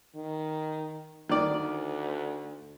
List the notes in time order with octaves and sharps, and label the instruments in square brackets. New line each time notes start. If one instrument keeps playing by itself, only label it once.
[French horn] D#3
[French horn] D2 [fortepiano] D#3 D5